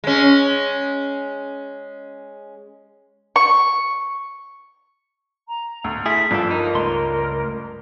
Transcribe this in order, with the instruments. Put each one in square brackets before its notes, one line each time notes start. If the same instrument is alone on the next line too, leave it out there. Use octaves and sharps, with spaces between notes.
[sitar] G#3 C#4
[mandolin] C#6
[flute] A#5
[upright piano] D2
[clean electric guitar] A3 E4 G#4 [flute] B6
[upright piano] G1 F3 [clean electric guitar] D4 A4 [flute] G5
[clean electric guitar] D#4 [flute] A#4
[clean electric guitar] C#2 A3 C6